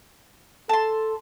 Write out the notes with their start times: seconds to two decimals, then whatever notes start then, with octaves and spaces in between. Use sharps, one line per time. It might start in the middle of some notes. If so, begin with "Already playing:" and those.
0.69 A4 A5 C6